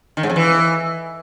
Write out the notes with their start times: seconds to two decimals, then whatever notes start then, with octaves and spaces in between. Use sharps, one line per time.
0.17 D#3
0.23 G#2
0.30 F2
0.36 E3